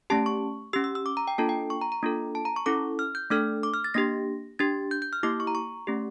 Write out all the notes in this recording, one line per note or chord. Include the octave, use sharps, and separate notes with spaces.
A3 C#4 G4 A5
C#6
C#4 G4 E6
E6
E6
D6
A#5
G5
A#3 D4 F4 A4 A5
G5
C#6
A#5
A#5
A#3 D4 F4 A4
A5
A#5
C#6
C#4 E4 A4 D6
F6
G6
A3 D4 A4 F6
D6
F6
A6
A#3 D4 G4 A#6
D4 G4 A6
G6
G6
F6
A#3 E4 G4 D6
C#6
A#5
C#6
A3 C#4 G4